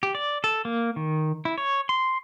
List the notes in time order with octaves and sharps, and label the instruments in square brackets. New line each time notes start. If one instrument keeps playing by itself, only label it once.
[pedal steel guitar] G4
D5
A4
A#3
D#3
E4
C#5
C6